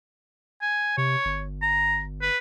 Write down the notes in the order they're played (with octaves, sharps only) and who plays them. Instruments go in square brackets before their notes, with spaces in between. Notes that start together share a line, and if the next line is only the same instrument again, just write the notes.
[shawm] G#5
[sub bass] C3 [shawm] C#5
[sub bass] G1
[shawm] A#5
B4